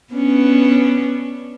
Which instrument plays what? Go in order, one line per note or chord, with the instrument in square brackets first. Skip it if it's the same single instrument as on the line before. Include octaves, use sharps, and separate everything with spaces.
[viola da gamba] B3 C#4 D4